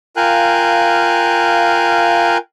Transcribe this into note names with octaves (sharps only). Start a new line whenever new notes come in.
F4 A#4 F5 G5 G#5 F#6